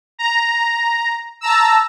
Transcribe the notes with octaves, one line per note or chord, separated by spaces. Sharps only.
A#5
A5 A#5 E6